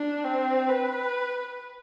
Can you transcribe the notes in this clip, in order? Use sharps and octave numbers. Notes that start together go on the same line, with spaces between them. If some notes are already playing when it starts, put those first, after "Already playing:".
Already playing: D4
C4
B4